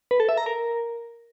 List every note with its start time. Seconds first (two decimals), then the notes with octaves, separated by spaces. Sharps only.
0.11 B4
0.20 A4
0.29 E5
0.37 A#5
0.46 A#4